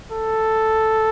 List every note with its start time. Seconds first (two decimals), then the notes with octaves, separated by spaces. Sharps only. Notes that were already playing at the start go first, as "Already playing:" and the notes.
0.12 A4